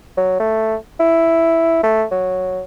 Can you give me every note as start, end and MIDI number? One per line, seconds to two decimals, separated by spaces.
0.18 0.37 54
0.40 0.76 57
1.00 1.81 64
1.84 2.05 57
2.12 2.62 54